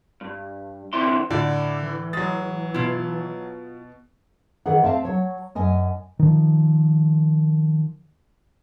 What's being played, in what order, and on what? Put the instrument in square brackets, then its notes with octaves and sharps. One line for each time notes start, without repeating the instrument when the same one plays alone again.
[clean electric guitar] G2
C2 D3 E3 C4 E4 C6
[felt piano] A2 [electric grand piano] D3 [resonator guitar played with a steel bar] D5
[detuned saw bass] E3
[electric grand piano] F#3 A6 [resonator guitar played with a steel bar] G#3
[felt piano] B2 [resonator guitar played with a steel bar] E4 F4
[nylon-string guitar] D#3 E3 G#4 F#5
C4 E5 F5 A5
F#3 C#5
F#2 D#5 G#5
[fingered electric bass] D#3 F3